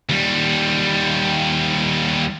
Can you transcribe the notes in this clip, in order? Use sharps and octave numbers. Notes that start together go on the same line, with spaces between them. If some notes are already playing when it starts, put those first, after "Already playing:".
D#2 G3